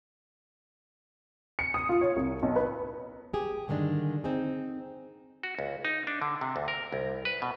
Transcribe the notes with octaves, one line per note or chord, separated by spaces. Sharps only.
C#7
D#6
F4
C#5
C2
B1
B4
G4 G#4
G2 D3 D#3 G#3 D4
C4 D#4 G#4
F#4
C#2
D#4
D4
D3
C3
D2
A#4
C2
B4
B2